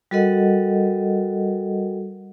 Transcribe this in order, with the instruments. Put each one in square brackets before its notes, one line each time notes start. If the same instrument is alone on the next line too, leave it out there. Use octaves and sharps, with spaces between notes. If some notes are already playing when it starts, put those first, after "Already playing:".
[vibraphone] G3 F#4 A4 A#4 D#5 F#5